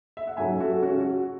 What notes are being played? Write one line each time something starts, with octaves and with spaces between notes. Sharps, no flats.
E5
F#5
G#2 F#3 C#4 E5 G#5
F#4 A4
C#3 G#3 C#4 F#4
F#4